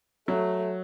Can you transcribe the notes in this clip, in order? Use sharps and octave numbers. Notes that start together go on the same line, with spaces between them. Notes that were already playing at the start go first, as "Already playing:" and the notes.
F#3 A3